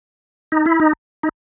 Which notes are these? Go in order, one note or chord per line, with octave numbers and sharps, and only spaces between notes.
D#4
E4
D#4
D#4